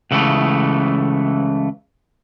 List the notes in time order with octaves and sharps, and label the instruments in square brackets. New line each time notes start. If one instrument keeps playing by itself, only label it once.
[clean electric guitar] C#2 C#3 E3 G3 A3